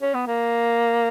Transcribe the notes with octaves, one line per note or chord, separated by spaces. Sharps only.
C#4
B3
A#3